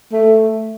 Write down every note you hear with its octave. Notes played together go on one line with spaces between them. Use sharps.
A3